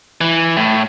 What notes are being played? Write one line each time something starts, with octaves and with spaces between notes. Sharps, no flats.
E3
A2